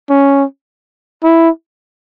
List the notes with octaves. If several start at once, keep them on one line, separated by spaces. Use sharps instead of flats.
C#4
E4